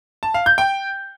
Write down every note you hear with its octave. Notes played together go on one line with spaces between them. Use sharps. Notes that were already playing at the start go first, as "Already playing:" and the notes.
A5
F5
G6
G5